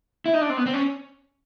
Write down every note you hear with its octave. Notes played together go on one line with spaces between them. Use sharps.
E4
D#4
D4
C4
B3
C4
C#4